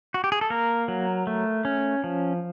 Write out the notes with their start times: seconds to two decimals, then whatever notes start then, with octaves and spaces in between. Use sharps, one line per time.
0.14 F#4
0.24 G4
0.32 G#4
0.41 A4
0.50 A#3 A#4
0.88 F#3
1.27 A3
1.65 C#4
2.04 F3